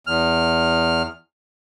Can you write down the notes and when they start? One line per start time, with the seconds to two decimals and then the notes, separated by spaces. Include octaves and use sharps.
0.07 E2 F6